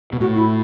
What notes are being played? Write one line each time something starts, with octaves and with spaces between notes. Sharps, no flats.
B2
A2 F#4
E4